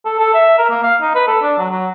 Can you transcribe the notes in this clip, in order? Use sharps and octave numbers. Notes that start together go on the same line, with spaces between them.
A4
A4
E5
A#4
A#3
F5
D#4
B4
A4
D4
F#3
F#3